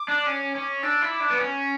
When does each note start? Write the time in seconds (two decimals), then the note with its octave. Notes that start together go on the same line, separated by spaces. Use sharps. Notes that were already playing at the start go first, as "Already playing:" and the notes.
Already playing: D6
0.09 D4
0.27 C#4
0.55 C#4
0.83 D4 E6
1.02 E4
1.11 D6
1.20 D4
1.30 B3
1.39 C#4